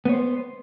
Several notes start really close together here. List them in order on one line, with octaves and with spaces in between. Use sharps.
B3 C#5 C5